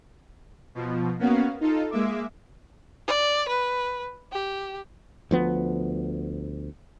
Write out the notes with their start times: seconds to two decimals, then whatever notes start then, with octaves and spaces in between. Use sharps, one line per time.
0.75 B2 F3
1.19 A#3 B3 C#4 F#4 F5
1.61 D#4 F4 A4
1.91 G#3 A#3 E5 D6
3.08 D5
3.49 B4
4.33 G4
5.31 D2 F3 B3